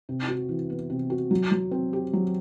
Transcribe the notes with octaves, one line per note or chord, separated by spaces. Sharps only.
C3
F#4
E3
B3
C3
F#4
F#3
F#3
C4
G4
F#3